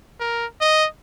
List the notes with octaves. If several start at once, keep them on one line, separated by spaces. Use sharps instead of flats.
A#4
D#5